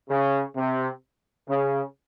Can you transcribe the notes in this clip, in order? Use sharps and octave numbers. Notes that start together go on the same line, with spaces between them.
C#3
C3
C#3